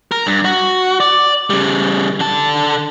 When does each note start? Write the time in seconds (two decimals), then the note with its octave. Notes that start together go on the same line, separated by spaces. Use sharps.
0.11 A#4
0.27 G2
0.45 F#4
1.00 D5
1.50 C#3 G3
2.20 D3 A5